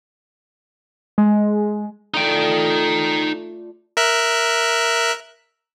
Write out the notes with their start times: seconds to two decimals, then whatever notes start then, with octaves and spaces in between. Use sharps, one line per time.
1.18 G#3
2.14 A3 D#4 F4 D5 G5
3.97 A#4 E5 F#6